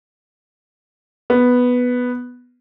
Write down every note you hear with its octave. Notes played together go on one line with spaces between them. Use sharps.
B3